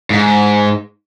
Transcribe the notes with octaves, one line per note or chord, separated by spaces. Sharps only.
G#2